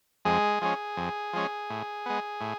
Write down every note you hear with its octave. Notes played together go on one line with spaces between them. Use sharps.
F2 G#3 G#4
F3 G#3 C#4
F2
F3 G#3 C#4
A2
G#3 B3
A2